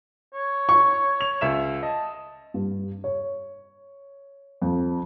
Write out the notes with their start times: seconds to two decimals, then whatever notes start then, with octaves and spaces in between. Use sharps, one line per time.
0.34 C#5
0.69 C#6
1.21 F7
1.41 C#2 E5 E7
1.83 D#5 A5
2.54 G2
3.04 C#5
4.62 F2